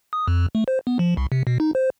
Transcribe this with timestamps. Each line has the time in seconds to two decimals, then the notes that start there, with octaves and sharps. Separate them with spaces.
0.13 D#6
0.27 F2
0.55 A3
0.68 C5
0.87 B3
0.99 F3
1.17 C2
1.32 C3
1.47 B2
1.60 D#4
1.75 C5